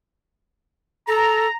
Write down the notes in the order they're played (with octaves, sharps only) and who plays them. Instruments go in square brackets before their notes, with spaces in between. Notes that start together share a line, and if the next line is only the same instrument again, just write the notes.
[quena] A4 [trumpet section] A#5